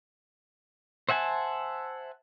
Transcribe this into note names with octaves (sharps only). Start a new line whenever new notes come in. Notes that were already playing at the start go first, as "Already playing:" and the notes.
C5 E5 F#5 G#5 A5